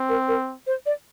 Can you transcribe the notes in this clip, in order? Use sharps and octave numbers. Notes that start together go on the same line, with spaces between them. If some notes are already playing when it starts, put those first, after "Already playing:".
Already playing: C4
A#4
A#4
C5
D5